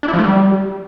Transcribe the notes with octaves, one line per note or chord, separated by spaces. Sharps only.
D4
E4
F3
A3
G3